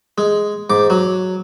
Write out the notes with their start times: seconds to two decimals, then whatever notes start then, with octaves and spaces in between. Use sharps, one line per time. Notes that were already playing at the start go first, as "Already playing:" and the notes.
0.18 G#3
0.70 G#2 D6
0.90 F#3